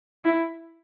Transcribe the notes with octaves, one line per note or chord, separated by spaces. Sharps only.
E4